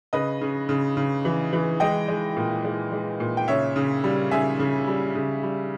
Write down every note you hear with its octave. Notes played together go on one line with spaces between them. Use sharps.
C#3 B4 D#5
C#3
C#3
C#3
E3
E3
G#3 D#5 G5
G#3
A#2
G#3
G#3
A#2
G5
C#3 C#5 E5
C#3
G3
C#3 E5 G#5
C#3
G3
C#3
G3